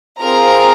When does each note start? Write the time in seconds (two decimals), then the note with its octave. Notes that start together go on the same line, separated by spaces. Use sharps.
0.20 C4 F4 G#4 A#4 A#5